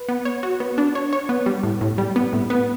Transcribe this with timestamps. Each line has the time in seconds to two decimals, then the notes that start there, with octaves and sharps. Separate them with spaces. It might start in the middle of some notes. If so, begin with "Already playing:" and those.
Already playing: B4
0.09 B3
0.25 C#5
0.43 F#4
0.60 B3
0.78 D4
0.95 C#5
1.13 C#5
1.29 B3
1.46 G3
1.63 A2
1.81 A2
1.98 G3
2.16 B3
2.33 A2
2.50 B3